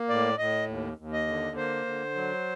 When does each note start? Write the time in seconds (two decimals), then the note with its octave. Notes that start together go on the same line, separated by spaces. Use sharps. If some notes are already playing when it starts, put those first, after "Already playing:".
Already playing: A#3
0.09 A2 D5
0.38 A2 D#5
0.68 D#2
0.98 D#2
1.13 D#5
1.27 D3
1.56 A#3 C5
1.86 D3
2.15 F#3